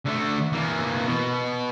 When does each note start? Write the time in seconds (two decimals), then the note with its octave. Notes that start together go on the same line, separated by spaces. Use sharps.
0.05 D3 A3
0.52 E3 A#3
1.07 B2